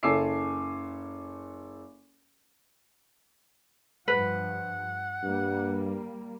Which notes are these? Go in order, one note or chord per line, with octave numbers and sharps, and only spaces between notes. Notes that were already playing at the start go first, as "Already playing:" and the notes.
F#1 A4 G#5 D6 E6 C7
G2 F3 B4 F#5
G2 G3 A#3